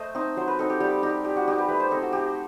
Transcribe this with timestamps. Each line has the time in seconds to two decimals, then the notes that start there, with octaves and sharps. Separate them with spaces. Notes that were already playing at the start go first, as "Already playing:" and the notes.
Already playing: A3 C5 D#5
0.15 C4 D#4
0.37 F#3 C5
0.48 B4
0.59 C4 D#4 A4
0.70 G4
0.80 G3 G4
1.03 D#4 G4
1.24 G3 G4
1.37 F#4
1.48 D#4 G4
1.58 B4
1.68 A3 B4
1.80 C5
1.91 C4 D#4 A4
2.02 F#4
2.13 A3 G4